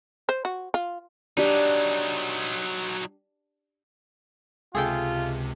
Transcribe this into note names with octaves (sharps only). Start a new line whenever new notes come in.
C5
F#4
F4
F#3 D4 D#4 G4
C#2 C3 F4 G#4 A4 G5